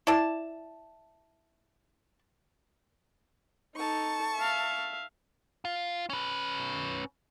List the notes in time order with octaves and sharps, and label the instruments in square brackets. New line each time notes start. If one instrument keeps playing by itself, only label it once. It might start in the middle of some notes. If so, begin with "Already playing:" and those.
[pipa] E4 D5 A5
[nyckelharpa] D#4 A4 [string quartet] A5 C#6
[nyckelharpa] E5 F5
[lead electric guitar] F4
C#4 B4